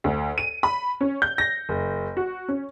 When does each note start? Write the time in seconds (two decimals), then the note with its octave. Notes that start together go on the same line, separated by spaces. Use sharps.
0.04 D2
0.38 D#7
0.63 B5
1.01 C#4
1.22 G6
1.38 A#6
1.69 F#1
2.17 F#4
2.48 C#4